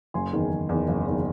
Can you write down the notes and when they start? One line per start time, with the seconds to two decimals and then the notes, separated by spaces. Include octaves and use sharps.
0.14 F#1 G#5 C6
0.33 E2 D#3
0.51 F#1
0.69 E2 D#3
0.88 F#1
1.06 E2 D#3